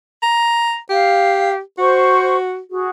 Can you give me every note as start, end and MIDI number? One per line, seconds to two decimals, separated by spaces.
0.22 0.77 82
0.90 1.59 67
0.90 1.52 77
1.78 2.60 66
1.78 2.36 72
1.78 2.36 85
2.71 2.90 66
2.71 2.90 68